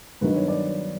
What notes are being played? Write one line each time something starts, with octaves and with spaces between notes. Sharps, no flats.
G2 D#3 F#3 B3 D#4 B4
C#5
D5